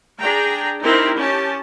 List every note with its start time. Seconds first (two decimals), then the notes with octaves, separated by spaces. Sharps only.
0.22 D4 G#4 G5 A#5
0.83 C4 D#4 E4 G4 A#4
1.18 C#4 G4 A5